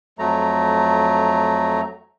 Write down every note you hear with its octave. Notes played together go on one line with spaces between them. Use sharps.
F2 F#3 A3 A#5